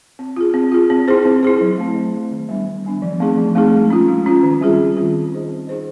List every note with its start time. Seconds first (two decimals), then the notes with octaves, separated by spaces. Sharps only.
0.19 C4
0.36 F4 G#4
0.54 C4
0.72 F4 G#4
0.90 C4
1.08 E4 G#4 C5
1.25 C4
1.43 E4 G#4 C5
1.61 F#3
1.78 A3 C4
1.96 F#3
2.14 A3 C4
2.31 D#3
2.49 G3 B3 D4
2.67 D#3
2.85 G3 B3 D4
3.02 F3
3.20 A3 C4 D#4 G#4
3.37 F3
3.55 A3 C4 D#4 G#4
3.73 G#3
3.90 C#4 F4
4.08 G#3
4.26 C#4 F4
4.43 D#3
4.61 G3 C4 F4 G#4
4.78 D#3
4.97 G3 C4 F4 G#4
5.14 C4
5.32 D#4 G#4 C5 D#5
5.49 C4
5.67 D#4 G#4 C5 D#5